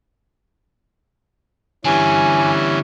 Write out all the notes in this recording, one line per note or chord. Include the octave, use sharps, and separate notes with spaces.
D3 E3 G3 C#4 G#5